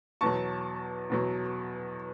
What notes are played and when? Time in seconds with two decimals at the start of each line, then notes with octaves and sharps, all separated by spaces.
0.21 E2 B2 F#3 A5 C#6
1.10 E2 B2 F#3